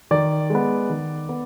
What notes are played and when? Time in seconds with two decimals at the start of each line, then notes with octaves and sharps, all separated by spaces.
0.11 D#3 D5
0.50 G#3 B3
0.90 D#3
1.29 B3